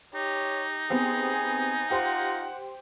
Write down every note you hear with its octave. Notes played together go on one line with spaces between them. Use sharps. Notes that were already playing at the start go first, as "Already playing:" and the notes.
D#4 G4 C#5
B3 C4 G4 G#4 G#5
F4 G4 C5 F#5 C6